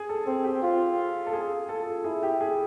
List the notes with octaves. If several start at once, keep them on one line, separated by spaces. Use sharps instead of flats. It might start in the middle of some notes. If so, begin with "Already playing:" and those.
Already playing: G#4
A4
C4 G#4
G4
F4
A4
G#4
A4
E4 G#4
G4
G#4